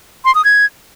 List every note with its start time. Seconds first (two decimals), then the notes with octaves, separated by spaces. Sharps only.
0.25 C6
0.35 D#6
0.45 G#6